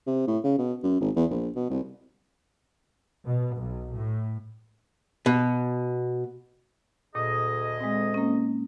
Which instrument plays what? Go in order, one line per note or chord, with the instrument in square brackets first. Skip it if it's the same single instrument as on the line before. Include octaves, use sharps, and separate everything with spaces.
[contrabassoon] C3
A2
C#3
B2
F#2
G#1
E2
A#1
B2
C2
[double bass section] B2
B1
A2
[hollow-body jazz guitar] B2
[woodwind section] D2 G#4 D#5 [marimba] A#2
[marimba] G#3 C4
A#3 C#4